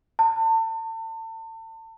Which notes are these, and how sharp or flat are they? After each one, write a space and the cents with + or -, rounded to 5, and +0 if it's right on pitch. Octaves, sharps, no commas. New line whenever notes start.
A5 +35